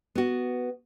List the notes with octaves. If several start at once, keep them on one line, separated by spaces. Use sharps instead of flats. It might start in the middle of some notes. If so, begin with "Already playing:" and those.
B3 F#4